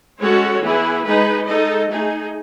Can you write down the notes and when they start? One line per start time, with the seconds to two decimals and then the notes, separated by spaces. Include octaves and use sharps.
0.22 G#3 C#4 F#4 A4 C#5
0.63 E3 B3 E4 G#4
1.05 G#3 D#4 G#4 B4
1.47 G#3 D#4 A4 D#5
1.89 A3 D#4 G#4